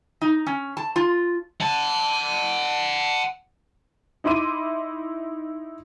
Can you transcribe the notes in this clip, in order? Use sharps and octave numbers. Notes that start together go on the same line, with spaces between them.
D#4
C#4
A5
F4
F#5 A5
D#4 E4 C6 D6 D#7